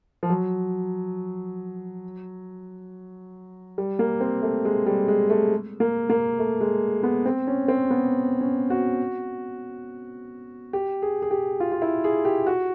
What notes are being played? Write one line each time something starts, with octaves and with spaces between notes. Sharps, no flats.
F3
F#3
G3
A#3
C4
A3
G#3
G3
G#3
A3
A#3
A#3
A3
G#3
B3
C4
C#4
C4
B3
C#4
F#4
G4
G#4
G#4
G4
F4
F4
E4
G#4
G4
F#4